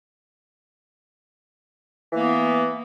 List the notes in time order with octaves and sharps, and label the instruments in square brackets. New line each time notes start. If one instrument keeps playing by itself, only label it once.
[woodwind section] E3
A#3
B3